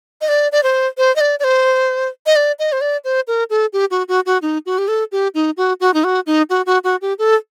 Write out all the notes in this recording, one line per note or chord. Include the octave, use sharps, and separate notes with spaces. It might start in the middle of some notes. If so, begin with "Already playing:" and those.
D#5
D5
D5
C5
C5
D#5
D5
D5
C5
D#5
D5
D#5
C5
D5
C5
A#4
A4
G4
F#4
F#4
F#4
D#4
F#4
G4
A4
G4
D#4
F#4
F#4
D#4
F#4
D#4
F#4
F#4
F#4
G4
A4